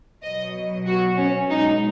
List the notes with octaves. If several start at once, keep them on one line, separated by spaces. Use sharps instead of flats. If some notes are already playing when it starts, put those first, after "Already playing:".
B2 F#3 D#5
F#4
C#4
B2 G#3 D#4